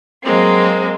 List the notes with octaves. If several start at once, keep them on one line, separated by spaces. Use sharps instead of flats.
F#3 G#3 A#3 C4